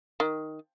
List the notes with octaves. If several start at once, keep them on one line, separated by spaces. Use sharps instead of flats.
D#3